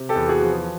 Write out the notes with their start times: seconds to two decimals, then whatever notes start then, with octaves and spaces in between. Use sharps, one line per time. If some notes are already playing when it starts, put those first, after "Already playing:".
Already playing: C3
0.09 G4 A4
0.15 E2
0.29 F#4 G#4
0.42 F3